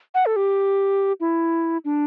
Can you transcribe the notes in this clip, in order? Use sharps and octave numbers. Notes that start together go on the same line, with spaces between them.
F#5
A4
G4
E4
D4